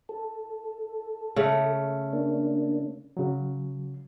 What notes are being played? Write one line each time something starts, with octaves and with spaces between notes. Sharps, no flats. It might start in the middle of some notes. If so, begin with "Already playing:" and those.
A4
C#3 A3
A#3 D4
C#3 F#3